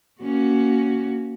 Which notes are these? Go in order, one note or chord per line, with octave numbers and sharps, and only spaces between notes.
A#3 C#4 F#4